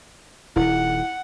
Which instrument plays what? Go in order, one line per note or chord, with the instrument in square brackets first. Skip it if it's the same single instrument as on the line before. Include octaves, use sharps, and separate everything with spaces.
[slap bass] D#1 D#2 [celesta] E4 [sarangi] F#5